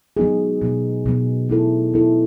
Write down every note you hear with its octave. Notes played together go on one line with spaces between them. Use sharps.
F#3 B3 D#4 G#4
B2 F#3 B3
B2 F#3 B3
B3 E4 A4
B3 E4 A4